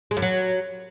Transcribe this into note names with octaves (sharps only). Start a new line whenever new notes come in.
G#3
F#2
F#3